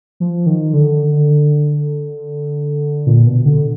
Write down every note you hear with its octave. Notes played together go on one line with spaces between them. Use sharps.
F3
D#3
D3
A#2
B2
D3